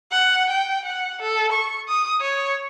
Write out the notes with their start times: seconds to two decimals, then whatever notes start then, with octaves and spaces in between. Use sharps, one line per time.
0.12 F#5
0.50 G5
0.85 F#5
1.22 A4
1.52 C#6
1.89 D#6
2.21 C#5